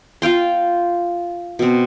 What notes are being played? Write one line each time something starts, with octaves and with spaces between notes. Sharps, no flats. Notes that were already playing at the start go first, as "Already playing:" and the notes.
F4 F5 G5 C6
B2 C4